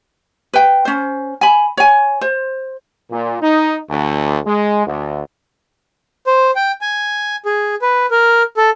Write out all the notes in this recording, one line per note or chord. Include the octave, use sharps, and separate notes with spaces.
B4 G5
C#4 C5
G#5 B5
C#5 G#5
C5
A#2
D#4
D2
G#3
D2
C5
G5
G#5
G#4
B4
A#4
A4